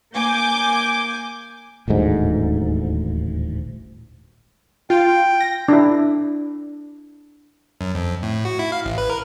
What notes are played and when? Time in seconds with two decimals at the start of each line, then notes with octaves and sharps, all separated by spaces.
0.14 A#3 G#5 D6 G6
1.88 D#1 A1 D2 G#2
4.90 F4 G5
5.41 A#6
5.68 D4 E4
7.81 F#2
7.95 F2
8.23 A2
8.45 F#4
8.59 E4
8.72 F5
8.85 A1
8.98 B4
9.10 A#4